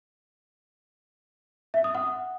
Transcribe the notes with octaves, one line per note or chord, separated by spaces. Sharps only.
E5
D#6
F#5